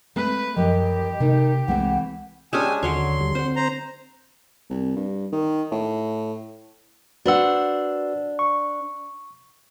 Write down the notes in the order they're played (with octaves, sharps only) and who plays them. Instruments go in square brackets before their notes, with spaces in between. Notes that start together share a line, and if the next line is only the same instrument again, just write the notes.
[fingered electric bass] G#3 C4 [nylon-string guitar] A3 [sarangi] B4
[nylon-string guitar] F#2 E3 [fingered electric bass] F3 [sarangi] G4 [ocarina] D#5
[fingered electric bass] C3 [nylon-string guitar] D#3 A3 D#4
[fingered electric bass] C2 G#3 [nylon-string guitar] E3 A3 C4 [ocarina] F#5
[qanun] G#3 C#4 D4 [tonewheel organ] G4 G5 E6 [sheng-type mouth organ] G#5 D#6
[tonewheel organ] D#2 [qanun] D3 F#3 C#5 [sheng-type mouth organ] C6
[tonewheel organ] D#2 G3
[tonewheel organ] C4 [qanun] C5 F#5
[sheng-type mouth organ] C5 A#5
[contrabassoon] C2
G2
D#3
A2
[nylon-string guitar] D4 C5 F#5 [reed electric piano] F#4 B4 E6
[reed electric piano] C#6